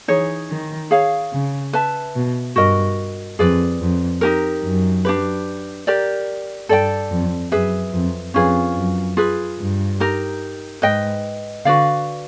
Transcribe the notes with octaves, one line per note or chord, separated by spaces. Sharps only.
E3 D#4 G#4 C#5
D#3
G#4 C#5 F5
C#3
B4 E5 A5
B2
G2 F#4 A#4 D#5
F2 G#4 B4 D5
F2
D#4 G4 A#4
F#2
D4 G4 B4
G4 A#4 D5
G2 A4 D5 G5
F2
F#2 G#4 B4 E5
F2
F2 C#4 F4 G#4 B4
F#2
F4 G#4 B4
G2
D#4 G4 A#4
G#2 B4 D#5 G5
D3 F#4 B4 D5 F5